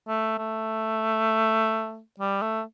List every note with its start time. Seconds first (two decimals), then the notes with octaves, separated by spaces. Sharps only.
0.08 A3
0.38 A3
2.20 G3
2.42 A3